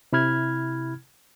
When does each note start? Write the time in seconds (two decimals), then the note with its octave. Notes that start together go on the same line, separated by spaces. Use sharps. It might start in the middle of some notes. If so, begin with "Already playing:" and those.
0.13 C3 E4 B5 F6 G#6